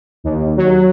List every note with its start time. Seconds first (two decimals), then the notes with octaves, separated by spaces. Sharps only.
0.24 D#2
0.57 F#3